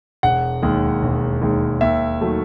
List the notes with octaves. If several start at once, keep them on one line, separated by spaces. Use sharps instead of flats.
E1 F#5
D#2 D#3 G#3
E1
D#2 D#3 G#3
D#2 E5
D#3 F#3 A3